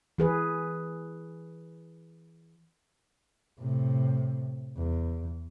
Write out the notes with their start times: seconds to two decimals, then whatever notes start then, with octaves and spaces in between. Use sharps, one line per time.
0.18 E3 G#4 B4
3.59 A2 C3
4.77 E2